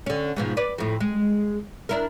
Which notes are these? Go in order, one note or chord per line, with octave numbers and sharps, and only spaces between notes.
D3 C#4
G#2 B2 F3
B4 D5
F2 A2
G#3
D4 E4 A#4